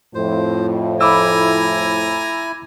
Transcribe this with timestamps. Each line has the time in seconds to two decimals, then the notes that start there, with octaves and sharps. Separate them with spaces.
0.15 F2 A2 F3 C5
1.01 E4 G#5 A#5 B5 D6 E6